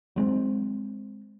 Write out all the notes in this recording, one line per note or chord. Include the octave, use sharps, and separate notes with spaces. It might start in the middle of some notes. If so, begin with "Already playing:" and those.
F#3 G#3 C4